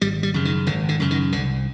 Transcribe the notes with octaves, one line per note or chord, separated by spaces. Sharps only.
G#1 G3
G3
F#2 C#3
D#3
G#1 D3
D3
F#2 C#3
D#3
C2 D3